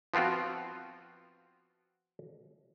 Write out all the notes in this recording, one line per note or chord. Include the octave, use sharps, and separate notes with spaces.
F3 B3 C4 F4 F#4